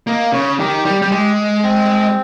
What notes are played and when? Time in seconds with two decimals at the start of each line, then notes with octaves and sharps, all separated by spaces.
0.07 A#3 D#5
0.33 C#3 C#5
0.59 D#3 G4
0.85 G3
1.02 G3
1.12 G#3
1.63 C4